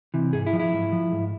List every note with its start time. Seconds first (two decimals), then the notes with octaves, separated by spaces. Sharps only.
0.14 C3 E3
0.33 G#2 G#4
0.47 E4
0.53 F3
0.60 E4
0.73 G#2
0.92 F3
1.12 G#2